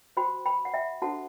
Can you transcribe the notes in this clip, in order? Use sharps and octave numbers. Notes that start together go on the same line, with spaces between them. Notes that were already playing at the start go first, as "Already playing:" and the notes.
F#4 C5 G5 B5
G5 B5
F#5
E5 G5
D4 F#4 A4 C5 F#5 A5